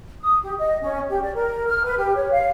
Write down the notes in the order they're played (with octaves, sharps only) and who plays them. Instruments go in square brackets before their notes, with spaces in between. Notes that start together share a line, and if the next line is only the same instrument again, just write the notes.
[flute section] D#6
G4
D#5
C#4
G4
D5
A#4
F6
B4
G4
C#5
F5